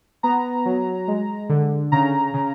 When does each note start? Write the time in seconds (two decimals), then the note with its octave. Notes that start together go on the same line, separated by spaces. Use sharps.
0.23 B3 A#5
0.65 F#3
1.08 G#3
1.49 D3
1.92 C#3 A#5
2.34 C#3